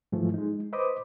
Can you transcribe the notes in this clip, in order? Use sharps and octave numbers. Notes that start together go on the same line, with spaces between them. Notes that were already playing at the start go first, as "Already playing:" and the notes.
G#2 E3 F3 A3
G#3 D#4
B4 C5 D#5 B5 D6 D#6